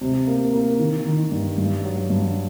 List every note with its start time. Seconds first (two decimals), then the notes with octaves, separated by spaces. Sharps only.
0.01 C3
0.27 A#3
0.53 A#3
0.79 D#3
1.06 D#3
1.32 G2
1.58 G2
1.84 F#3
2.10 G2